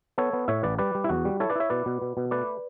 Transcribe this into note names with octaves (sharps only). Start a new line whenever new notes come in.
B3 A4 C#5
B3
A2 C#5 E5
A1 B4 D5
G3 B4 D5
G3
E4
E2 F#4
G3
E4 A4 C#5
B4 D5
E4 C#5 E5
B2 B4 D5
B2
B2
B2
A3 B4 D5